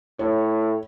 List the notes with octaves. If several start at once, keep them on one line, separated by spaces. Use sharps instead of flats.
A2 C#5